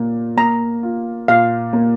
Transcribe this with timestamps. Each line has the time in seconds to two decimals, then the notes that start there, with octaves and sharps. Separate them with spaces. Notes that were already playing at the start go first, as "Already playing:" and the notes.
Already playing: A#2 A#3
0.37 A#3 A#5
0.83 F4
1.28 A#2 F5
1.73 A#3